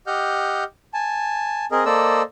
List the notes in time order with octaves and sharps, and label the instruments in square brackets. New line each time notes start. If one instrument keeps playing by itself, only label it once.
[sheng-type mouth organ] G4 D#5 F#5 F6 G6
G#5 A5
C4 G#4 A#4 D#5
A#3 A4 C5 D5 D#5 E6